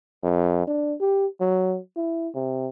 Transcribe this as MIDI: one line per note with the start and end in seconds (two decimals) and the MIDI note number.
0.23 0.67 41
0.67 0.94 62
1.01 1.26 67
1.41 1.78 54
1.96 2.29 64
2.35 2.68 48